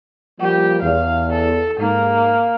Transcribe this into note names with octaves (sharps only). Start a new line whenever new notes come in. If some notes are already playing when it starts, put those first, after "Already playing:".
F3 G3 A#3 G4
E2 F5
A4
G#2 A#3